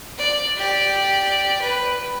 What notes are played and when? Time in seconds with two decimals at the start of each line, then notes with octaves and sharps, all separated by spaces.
0.18 D5
0.57 G4 D5
1.62 B4